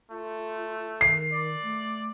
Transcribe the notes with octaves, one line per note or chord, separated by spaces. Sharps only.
A3 F4
D#3 C7
D5
A3